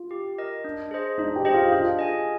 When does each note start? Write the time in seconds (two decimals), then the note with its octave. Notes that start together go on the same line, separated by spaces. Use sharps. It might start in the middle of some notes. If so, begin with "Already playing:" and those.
Already playing: F4
0.11 G4
0.38 A#4 D#5
0.64 D4
0.91 G#4 C5 D#5
1.18 D4 D#4 D#5
1.36 G4 G5
1.45 G#4 C5 D#5
1.54 F4 F5
1.72 D4 F4 F5
1.99 G#4 D#5 G#5